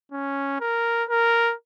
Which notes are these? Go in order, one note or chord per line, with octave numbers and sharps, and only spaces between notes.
C#4
A#4
A#4